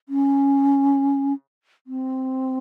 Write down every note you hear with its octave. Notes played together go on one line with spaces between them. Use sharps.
C#4
C4